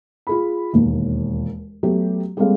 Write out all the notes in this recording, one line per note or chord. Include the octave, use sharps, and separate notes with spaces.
F4 G#4 B5
E1 D#2
F#3 A3 B3 G4
G3 G#3 A#3 C4 A4 F5